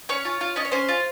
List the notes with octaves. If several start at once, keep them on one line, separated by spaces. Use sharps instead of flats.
C#4 C#5
F4
F4
C#4 D#5
C#5
C#4 C5
F4